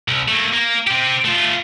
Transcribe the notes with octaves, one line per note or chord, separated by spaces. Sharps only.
C2
A3 A#3
A#3
C4 G4
A3 F4